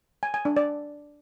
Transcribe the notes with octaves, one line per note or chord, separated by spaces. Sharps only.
G#5
G#5
D4
D5